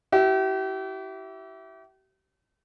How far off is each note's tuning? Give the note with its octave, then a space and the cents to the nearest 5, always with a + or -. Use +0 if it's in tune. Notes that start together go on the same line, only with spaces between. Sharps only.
E4 +0 G4 -40 E5 +0